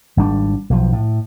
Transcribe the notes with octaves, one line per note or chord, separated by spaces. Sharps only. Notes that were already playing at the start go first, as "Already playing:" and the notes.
G#1 G3 D4
B1 F3
A2